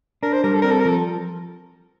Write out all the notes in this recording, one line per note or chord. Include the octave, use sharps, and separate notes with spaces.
D4 A#4
C5
G3 A#4
A4
C4 A#4
A4
A#4
F3 A4